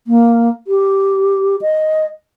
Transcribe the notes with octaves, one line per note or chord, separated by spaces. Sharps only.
A#3
G4
D#5